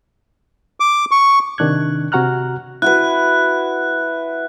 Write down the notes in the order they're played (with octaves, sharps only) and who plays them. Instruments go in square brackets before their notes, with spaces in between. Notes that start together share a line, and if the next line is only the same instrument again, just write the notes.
[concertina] D6
C#6
[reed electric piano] C3 D#3 D4 F#6 G#6
C3 F#4 F#5 A#5 F6 F#6
[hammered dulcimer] E4 F#4 B4 [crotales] F#6